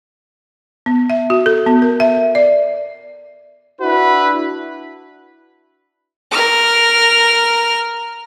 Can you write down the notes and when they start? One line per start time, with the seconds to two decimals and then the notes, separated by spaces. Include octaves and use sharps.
0.86 B3
1.10 E5
1.30 F#4
1.46 A4
1.66 B3
1.82 A#4
2.00 E5
2.35 D5
3.81 D4 E4 F#4 B4
6.31 A#4 F6